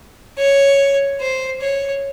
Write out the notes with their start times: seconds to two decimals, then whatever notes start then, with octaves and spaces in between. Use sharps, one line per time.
0.38 C#5
1.21 C5
1.62 C#5